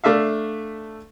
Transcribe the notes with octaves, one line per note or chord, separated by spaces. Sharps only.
A3 D4 E5 F5